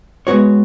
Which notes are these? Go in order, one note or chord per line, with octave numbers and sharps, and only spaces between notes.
G#3 B3 F#4 C#5